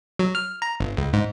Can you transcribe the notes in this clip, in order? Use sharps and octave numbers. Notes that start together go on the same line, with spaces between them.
F#3
F6
A#5
G1
C#2
G#2